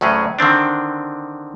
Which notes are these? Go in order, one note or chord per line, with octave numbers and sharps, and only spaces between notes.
D2 A2 F#3 C#4 G#4
D3 D#3 C4 D4